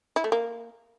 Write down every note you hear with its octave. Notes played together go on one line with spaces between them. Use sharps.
E4
A3
A#3